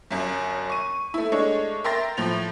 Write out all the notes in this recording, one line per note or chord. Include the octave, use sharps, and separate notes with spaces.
G1 F#2
C#6 D#7
A3 E4
G#3 A3 D4 C#5 D#5
A#4 E5 G5 C6 A6 A#6
A2 F3 F7